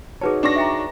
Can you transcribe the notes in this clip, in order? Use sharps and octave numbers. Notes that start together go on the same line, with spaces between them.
D#4 F#4 G#4 B4 C#5 A5
D4 C#6 A#6
E5 G5 A#5